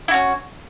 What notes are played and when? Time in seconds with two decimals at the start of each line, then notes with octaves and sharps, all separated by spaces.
0.08 E4
0.11 F#4
0.14 C#4